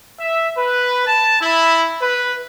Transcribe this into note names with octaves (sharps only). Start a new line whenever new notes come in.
E5
B4
A5
E4
B4